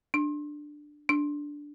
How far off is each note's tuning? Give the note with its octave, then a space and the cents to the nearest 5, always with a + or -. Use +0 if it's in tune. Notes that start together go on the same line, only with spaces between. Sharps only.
D4 +10
D4 -5